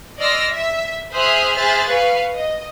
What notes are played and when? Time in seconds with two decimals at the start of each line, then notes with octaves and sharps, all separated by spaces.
0.18 D5 D#5 C6 E6 F6 A#6
0.54 E5
1.14 G#4 C5 E5 D#6 F6 F#6
1.56 G#4 C5 E5 F6 F#6 A6
1.88 B4 F5 C#6
2.35 D#5